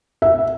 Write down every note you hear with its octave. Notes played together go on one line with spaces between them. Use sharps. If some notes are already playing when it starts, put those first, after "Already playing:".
E5